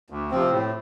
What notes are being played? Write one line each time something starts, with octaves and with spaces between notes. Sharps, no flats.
D2
C3 F3 C4
A2